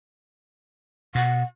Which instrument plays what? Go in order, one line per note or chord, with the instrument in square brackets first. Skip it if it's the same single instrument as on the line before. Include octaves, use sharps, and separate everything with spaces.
[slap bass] B2 [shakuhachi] F#5